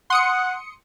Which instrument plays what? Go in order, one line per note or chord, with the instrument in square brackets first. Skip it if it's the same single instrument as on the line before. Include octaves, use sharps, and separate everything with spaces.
[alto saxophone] F#5 [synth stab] C6 D#6 C#7